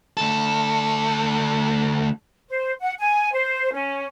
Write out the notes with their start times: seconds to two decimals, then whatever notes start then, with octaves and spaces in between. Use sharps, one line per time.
0.17 D2 A4
2.49 C5
2.81 F#5
2.98 G#5
3.33 C5
3.72 C#4